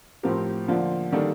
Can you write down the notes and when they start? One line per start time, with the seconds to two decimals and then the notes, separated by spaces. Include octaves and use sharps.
0.23 A2 F3 C4 G4 A#4
0.67 D3 F3 A#3 D4 F4
1.13 D#3 G3 A#3 D4 A4